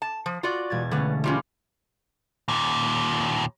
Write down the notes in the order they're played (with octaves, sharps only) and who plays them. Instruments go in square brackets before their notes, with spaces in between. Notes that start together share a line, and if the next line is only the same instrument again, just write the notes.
[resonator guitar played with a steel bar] A5
F3
F4 F#4 D5
[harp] E1 G#6 A6
[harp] D3 A3 C#4 [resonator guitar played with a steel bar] G3 B4
[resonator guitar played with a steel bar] F3 G3 C#4 [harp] E4 F4
[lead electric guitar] D#2 A#2